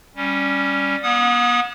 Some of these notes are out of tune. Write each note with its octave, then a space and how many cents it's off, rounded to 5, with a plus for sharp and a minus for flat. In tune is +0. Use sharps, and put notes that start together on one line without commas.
G3 +0 C#4 +0
B3 -45 F#5 -30 D#6 +0